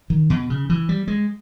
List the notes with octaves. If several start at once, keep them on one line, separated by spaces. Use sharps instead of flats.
D#3
B2
C#3
E3
G3
G#3